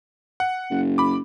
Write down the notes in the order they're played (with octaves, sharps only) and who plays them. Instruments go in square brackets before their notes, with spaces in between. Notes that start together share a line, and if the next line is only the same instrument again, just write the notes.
[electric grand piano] F#5
[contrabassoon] F#1
[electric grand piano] B5 D6